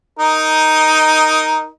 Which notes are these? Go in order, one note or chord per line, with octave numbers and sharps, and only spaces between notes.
D#4 A#4 D#5